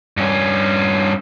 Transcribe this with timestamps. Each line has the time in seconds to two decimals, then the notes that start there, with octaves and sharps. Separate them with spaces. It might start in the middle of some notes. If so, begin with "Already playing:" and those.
0.17 G2 C#4